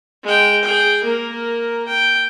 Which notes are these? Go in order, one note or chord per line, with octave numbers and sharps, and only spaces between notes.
G#3 G5
G#4 G5
A#3 A#4
G5